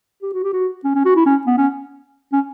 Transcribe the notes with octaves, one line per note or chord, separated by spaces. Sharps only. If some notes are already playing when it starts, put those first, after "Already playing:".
G4
F#4
G4
F#4
C#4
C#4
F#4
E4
C#4
B3
C#4
C#4